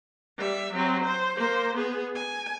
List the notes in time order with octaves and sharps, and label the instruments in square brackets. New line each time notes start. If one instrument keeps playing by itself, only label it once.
[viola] G3 E5
F#3 C4
C5
A#3 C5
B3 G#4
G#5